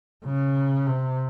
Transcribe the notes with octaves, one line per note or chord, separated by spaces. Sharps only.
C#3
C3